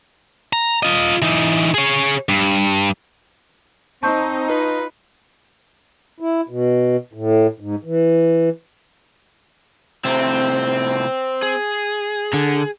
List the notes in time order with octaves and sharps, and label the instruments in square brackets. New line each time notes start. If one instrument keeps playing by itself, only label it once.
[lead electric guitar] A#5
F4 D#5
E3 D#4
G#4 C#5
G2
[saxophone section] C4 [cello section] D#4 [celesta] A5 C#6 G6
[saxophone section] F4 B4
[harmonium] E4
B2
A2
G#2
E3
[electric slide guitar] A2 C3 [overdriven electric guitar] C4
[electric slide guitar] G#4
[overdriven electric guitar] D3